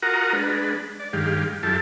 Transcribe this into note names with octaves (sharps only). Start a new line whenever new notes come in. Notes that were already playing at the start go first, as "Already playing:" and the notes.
F4 F#4 A#4 F#5 A#5 D#6
G#3 D4 B4
D5
G2 D#3 G#3 G4 F5
F#2 E4 F4 G4 A4 A5